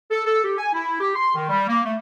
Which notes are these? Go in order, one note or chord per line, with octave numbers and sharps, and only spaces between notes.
A4
A4
G4
G#5
E4
G4
C6
D#3
G3
A#3
A3